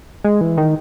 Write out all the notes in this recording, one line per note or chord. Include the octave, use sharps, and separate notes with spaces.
G#3
E3
D#3